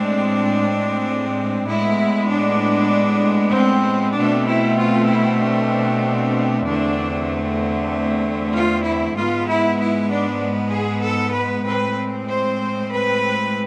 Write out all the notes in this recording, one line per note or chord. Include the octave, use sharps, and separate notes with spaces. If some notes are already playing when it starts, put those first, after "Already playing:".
Already playing: A2 G#3 C4 D4
A2 G#3 B3 E4
D4
C4
B2 A3 C4 D4
E4
F4
E4
D4
E2 D3 A3 C4 D4
F4
E4
G#2 G#3 B3 F4
E4
E4
D4
G#4
A4
B4
A2 G#3 C4 B4
C5
B4